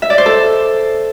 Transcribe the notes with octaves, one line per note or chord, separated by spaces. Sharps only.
E5
D5
C5
A4